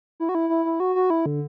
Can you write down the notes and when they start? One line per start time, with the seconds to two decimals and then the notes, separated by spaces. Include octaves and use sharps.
0.20 E4
0.29 F#4
0.35 E4
0.49 E4
0.65 E4
0.80 F#4
0.95 F#4
1.10 E4
1.26 D3